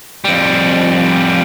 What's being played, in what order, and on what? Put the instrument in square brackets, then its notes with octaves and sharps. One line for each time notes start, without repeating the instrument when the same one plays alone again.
[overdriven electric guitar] F2 G3